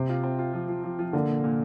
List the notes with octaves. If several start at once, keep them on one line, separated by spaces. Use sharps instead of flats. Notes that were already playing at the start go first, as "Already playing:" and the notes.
Already playing: C3 C4
F4
C4
F4
F3
F3
F3
F3
D3 A#3
A#2
A#2